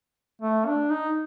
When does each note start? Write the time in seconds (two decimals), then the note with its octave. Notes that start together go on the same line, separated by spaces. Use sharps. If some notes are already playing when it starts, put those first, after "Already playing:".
0.42 A3
0.66 D4
0.90 D#4